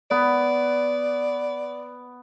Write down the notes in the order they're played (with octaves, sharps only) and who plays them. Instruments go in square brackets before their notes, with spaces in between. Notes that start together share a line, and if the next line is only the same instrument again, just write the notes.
[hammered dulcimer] B3 [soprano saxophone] D5